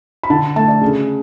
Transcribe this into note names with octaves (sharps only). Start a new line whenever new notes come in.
B5
D3 A5
A3 A5
D5
C#3